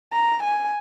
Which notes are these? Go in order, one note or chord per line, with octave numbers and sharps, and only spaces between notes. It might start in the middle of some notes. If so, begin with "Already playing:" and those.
A#5
G#5